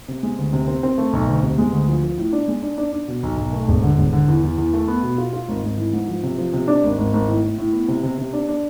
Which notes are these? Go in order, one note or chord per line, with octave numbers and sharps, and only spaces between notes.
C3
G#3
D2
C3
C4
C4
A3
B1
D2
C3
G#3
D2
F3
F3
A2
D4
G#3
D4
D4
D4
B2
B1
B1
A3
E1
D3
E1
D3
E2
E2
E2
A3
B3
B2
F4
F4
G#1
G#1
E3
G#2
F3
C3
F3
C3
D4
G#1
G#1
G#1
A2
A2
A2
B3
C3
C3
C3
D4
D4